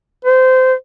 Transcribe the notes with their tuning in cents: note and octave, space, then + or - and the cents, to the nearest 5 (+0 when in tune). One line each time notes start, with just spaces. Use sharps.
C5 -20